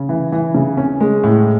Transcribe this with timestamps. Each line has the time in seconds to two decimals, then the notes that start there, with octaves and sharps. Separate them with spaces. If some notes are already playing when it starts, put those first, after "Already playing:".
Already playing: C#3
0.09 E3
0.32 E3
0.55 C#3
0.77 C#4
1.00 G#3
1.24 A2